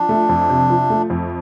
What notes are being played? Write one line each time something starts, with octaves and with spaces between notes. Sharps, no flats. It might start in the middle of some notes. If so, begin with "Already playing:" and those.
Already playing: F3 D4
A3
F2
C3
F3
A3
F2